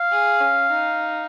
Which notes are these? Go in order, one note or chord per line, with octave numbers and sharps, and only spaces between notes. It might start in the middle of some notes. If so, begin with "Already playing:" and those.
Already playing: F5
G#4
C#4
D#4